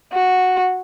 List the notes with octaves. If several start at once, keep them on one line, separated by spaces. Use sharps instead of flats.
F#4